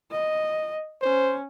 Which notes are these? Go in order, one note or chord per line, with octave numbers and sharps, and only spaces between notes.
D#5
C#4 C5